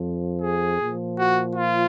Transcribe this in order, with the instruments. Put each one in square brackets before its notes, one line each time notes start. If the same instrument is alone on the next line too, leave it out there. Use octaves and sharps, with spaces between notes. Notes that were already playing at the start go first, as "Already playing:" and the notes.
Already playing: [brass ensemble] F2 F3
G#4
A#2 F3
F#4
F4